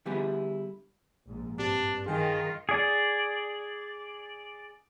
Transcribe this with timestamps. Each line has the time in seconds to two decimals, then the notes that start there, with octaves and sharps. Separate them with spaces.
0.06 D3 G3 B3 E4 G4 G#4
1.26 A#1 G#2
1.59 G2 C4 D4 G4
2.06 D#3 F4 G#4 G5 G#5
2.69 G#4 D5